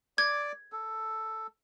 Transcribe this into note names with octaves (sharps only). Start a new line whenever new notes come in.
D5 D6 G#6
A4